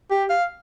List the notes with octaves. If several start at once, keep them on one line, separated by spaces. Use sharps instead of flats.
G4
F5